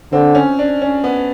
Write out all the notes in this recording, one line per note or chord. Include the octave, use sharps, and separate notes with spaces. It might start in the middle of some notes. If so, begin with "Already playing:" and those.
D3 C4
C#4
D4
C#4
B3